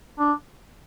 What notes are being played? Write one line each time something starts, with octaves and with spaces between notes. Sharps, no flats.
D4